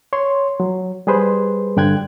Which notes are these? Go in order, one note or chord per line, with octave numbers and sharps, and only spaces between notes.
C#5 C6
F#3
G3 G#4 B4 C5
G2 D3 G5 F#6 G#6